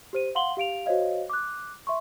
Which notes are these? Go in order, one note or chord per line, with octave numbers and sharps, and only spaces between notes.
G4 C5 D#7
F5 F#5 C6 F#7 G7
G4 F5 D7 F7
F#4 C5 C#5 D#5 F5
D6 F#6
E5 C6 C#6